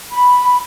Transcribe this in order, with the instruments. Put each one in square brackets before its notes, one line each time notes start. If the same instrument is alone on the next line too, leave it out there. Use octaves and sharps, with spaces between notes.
[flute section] B5